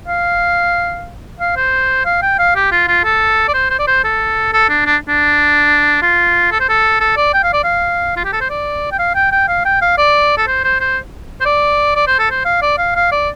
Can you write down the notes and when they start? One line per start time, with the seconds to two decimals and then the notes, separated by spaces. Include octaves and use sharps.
0.08 F5
1.40 F5
1.56 C5
2.05 F5
2.22 G5
2.39 F5
2.55 G4
2.72 F4
2.88 F4
3.04 A4
3.48 D5
3.54 C5
3.70 C5
3.79 D5
3.87 C5
4.04 A4
4.53 A4
4.69 D4
4.86 D4
5.08 D4
6.02 F4
6.51 A4
6.60 C5
6.69 A4
7.00 A4
7.17 D5
7.34 G5
7.43 F5
7.53 D5
7.64 F5
8.16 F4
8.25 G4
8.32 A4
8.41 C5
8.50 D5
8.92 G5
8.99 F5
9.15 G5
9.32 G5
9.48 F5
9.65 G5
9.82 F5
9.98 D5
10.37 A4
10.47 C5
10.64 C5
10.80 C5
11.41 C5
11.46 D5
11.95 D5
12.07 C5
12.19 A4
12.30 C5
12.45 F5
12.62 D5
12.78 F5
12.95 F5
13.12 D5